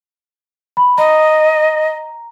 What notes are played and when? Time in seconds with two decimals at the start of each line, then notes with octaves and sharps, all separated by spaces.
0.77 B5
0.98 D#5 A#5